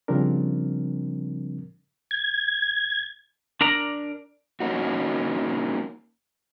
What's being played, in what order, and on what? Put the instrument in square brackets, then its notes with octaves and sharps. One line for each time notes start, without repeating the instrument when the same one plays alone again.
[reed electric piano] C#3 F3 G3 C4 D4 A#4
[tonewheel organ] G#6
[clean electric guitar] D4 A#4 D5 A#5
[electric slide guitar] A#3 C#4 D#4 F#4